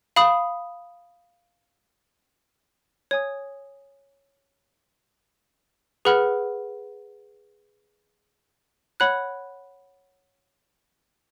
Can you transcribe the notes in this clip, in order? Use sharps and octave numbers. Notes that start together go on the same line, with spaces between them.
F5 B5 D#6
C#5 G#5 D#6
G#4 B4 F#5 B5 F6
C#5 F#5 B5 F#6